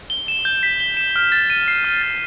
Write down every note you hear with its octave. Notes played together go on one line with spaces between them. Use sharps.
G7
E7
G6
B6
G7
E7
F6
A6
D#7
C7
F6
A6